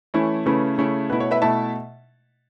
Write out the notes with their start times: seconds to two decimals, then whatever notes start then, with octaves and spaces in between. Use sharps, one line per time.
0.14 E3 A3 C#4 E4
0.46 C#3 A3 C#4 E4 B4
0.78 C#3 A3 C#4 E4
1.10 B2 A3 E4 B4
1.20 C#5
1.31 B4 E5
1.42 B2 A3 E4 E5 A5